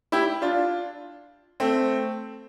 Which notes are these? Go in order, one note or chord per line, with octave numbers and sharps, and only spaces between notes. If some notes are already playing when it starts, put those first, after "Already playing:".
E4 G4
D4 F4
A3 C4